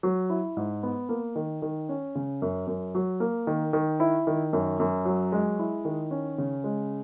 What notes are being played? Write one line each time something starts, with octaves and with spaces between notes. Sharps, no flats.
F#3
E4
G#2
B3
A#3
D#3
D#3
C#4
C#3
F#2
F#2
F#3
A#3
D#3
D#3
E4
D#3
F#2
F#2
F#3
G#3
E4
D#3
C#4
C#3
G#3